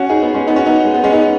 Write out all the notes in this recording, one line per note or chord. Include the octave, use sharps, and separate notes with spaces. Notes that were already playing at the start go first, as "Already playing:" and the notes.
Already playing: C#4 F#4
D#4 G#4
B3
G#3 C#4
B3 D#4
C#4 F#4
B3 D#4
G#3
B3
G#3 C#4
B3 D#4